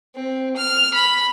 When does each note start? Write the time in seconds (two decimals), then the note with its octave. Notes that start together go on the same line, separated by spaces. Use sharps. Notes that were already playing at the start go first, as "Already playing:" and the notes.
0.16 C4
0.57 F6
0.94 B5